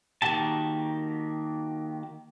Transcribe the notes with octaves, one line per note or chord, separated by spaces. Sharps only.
D#3 A#3 F#4 G4 A5